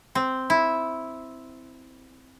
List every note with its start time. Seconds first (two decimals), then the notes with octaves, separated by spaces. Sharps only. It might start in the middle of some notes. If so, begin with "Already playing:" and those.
0.15 C4
0.50 E4